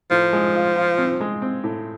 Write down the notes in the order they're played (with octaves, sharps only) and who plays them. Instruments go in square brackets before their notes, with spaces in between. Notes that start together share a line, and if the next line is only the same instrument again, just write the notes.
[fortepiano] A2 [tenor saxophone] F3
[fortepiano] G#3
F4
F4
C4
G#3
C4
A2